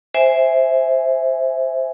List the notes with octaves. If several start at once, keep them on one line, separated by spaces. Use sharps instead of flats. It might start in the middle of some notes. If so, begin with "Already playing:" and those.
C5 E5 G#5